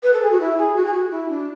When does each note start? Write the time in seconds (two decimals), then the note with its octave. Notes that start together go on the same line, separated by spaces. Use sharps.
0.03 B4
0.13 A4
0.22 G#4
0.31 F#4
0.40 E4
0.58 G#4
0.76 F#4
0.85 G#4
0.93 F#4
1.10 E4
1.29 D4